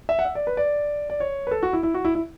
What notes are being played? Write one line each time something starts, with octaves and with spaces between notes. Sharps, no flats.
E5
F#5
E5
D5
B4
D5
D5
C#5
B4
A4
F#4
E4
E4
F#4
E4
E4